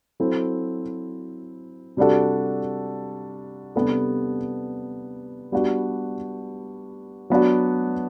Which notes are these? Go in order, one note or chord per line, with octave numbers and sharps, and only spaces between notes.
F#3 C4 E4 A4
C3 G3 D4 F#4 A4
C3 G3 B3 D4 A4
G3 B3 D4 F#4
F#3 B3 D4 F#4